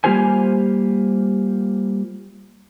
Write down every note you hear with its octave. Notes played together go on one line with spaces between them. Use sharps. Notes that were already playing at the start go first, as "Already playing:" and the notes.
G3 A#3 F4 G4 C5 G#5